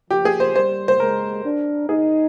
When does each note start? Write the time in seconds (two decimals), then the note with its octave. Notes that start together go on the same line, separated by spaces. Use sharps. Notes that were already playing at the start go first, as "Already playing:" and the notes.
0.10 F3 G4
0.25 G#4
0.40 C5
0.55 G3 C5
0.88 C5
1.00 G#3 A#4
1.45 D4
1.89 D#4 G#4